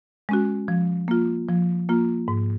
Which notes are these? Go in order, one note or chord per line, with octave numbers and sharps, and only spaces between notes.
G#3 C#4 F#4
F3
A#3 F4
F3
A#3 F4
G#2